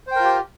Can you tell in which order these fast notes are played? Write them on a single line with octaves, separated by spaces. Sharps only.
C5 G5 A#4 F4 G4